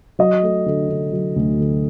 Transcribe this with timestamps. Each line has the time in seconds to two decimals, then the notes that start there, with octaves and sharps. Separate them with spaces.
0.19 F#3 D#5
0.42 A3
0.66 D3
0.89 D3
1.13 F#3
1.36 D2
1.59 D3